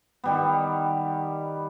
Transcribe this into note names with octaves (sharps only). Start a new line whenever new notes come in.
D#3 G3 B3